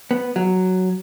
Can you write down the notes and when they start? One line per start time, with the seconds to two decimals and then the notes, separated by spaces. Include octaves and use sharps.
0.11 B3
0.36 F#3